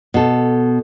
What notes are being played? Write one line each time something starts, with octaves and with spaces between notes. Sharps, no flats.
B2 A4